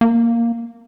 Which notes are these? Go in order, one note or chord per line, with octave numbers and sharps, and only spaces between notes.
A#3